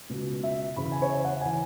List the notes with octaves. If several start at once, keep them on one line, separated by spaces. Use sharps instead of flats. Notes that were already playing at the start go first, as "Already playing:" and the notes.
C#2 B2
E5
E2 C#3 E3 B5
G#5
C#5
E5
F#5
E3 G#5